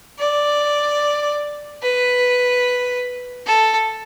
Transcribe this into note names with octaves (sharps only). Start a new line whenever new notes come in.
D5
B4
A4